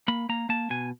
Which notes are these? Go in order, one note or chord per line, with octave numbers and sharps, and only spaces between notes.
A#3 B5
A#3 A#5
A#3 A5
B2 G#5